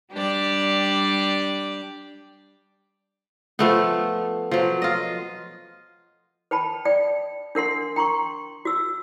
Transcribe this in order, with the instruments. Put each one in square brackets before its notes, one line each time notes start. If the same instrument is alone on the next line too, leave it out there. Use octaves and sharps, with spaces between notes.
[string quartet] G3 D4 G4 D5
[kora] F3 A3 B3
F3 F#3
F4 D#5
[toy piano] B4 G5 A5 B5
D5 G5
D4 A#4 F#5 C6
G5 A#5 C6 C#6
F#4 E6